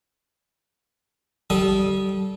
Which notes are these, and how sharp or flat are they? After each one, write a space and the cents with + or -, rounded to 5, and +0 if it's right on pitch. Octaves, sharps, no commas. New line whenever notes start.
G3 -20 A4 -20 D#6 +0